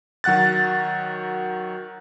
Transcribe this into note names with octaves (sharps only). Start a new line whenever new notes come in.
D#3 F#3 F#5 F#6 A6